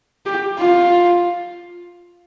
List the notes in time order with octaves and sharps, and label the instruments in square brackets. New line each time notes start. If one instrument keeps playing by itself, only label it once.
[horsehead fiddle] G4
F4